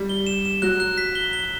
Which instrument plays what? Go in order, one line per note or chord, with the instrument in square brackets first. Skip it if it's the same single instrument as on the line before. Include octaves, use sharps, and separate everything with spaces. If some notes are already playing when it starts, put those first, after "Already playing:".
Already playing: [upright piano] G3
[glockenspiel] G7
E7
E7
[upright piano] F#3 [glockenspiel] F#6
[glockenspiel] F#6
B6
G7
G7